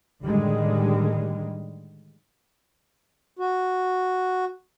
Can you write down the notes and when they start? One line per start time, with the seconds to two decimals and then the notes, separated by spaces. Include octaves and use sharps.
0.23 A2 D3 D#3 G3 G#3
3.39 F#4